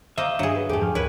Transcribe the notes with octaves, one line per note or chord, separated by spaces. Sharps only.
A#3 C5 D#5 E5
G2 D3 F#3 D4 G#4
B4
F2 G#2 A3 G4 G#4
F3 G5 F6
D2 E4 A#4 B4 C#5